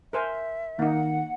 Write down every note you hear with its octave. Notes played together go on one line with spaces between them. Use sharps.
A#4 C5 E5 G#5
D#3 A#3 D#4 F#5